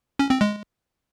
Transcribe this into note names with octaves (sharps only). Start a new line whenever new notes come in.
C#4
C4
G#3